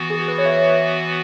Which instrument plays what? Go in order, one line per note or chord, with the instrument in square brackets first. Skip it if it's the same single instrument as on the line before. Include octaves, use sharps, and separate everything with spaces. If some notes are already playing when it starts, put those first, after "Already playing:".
Already playing: [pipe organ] E3 B3 F#4
[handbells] G#4
B4
C#5
E5